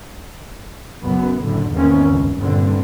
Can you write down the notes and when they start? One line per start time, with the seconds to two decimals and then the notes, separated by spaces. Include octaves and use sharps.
1.04 F#1 F#2 B3
1.42 F#1 A2 D3
1.73 E2 G#2 D#3 A#3 C4 C#4
2.09 G1 C#2
2.38 G2 A#2 D3 C4